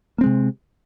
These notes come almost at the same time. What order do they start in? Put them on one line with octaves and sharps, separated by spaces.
A#3 C4 G#3 C3